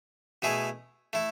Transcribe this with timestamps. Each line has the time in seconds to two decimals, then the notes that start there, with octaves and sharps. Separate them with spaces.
0.42 B2 A3 E4 G#4
1.13 A3 E4